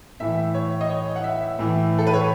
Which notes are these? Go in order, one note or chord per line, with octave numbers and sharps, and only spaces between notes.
A2 E3 E5
C#5
D#5
C#5
F#5
E5
A2 E3
A4
B4
C#5